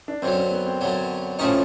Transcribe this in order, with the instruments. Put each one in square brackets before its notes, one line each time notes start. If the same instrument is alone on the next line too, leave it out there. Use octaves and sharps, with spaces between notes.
[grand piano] D4
[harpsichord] F#2 D3 F#3 [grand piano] C4
[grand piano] C4
B3
C4
[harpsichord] F#2 D3 F#3
[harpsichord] A2 F3 A3 C4 D#4 [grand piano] C#4